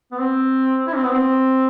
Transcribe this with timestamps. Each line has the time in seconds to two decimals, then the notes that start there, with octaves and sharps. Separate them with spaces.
0.11 B3
0.19 C4
0.87 E4
0.95 C4
1.04 B3
1.11 C4